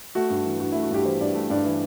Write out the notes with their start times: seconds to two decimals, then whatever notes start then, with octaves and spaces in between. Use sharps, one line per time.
0.15 A3 F#4
0.30 G2
0.45 E3
0.60 G2 F#4
0.72 A3 E4
0.82 F#4
0.91 G2 G4
1.05 E3 C5
1.21 G2 D5
1.35 A3
1.50 G2 D5
1.65 E3